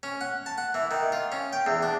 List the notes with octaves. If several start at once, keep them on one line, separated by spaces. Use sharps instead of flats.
C#4
F#5
A5
F#5
E3
D#3
F4
C#4
G5
E2
D4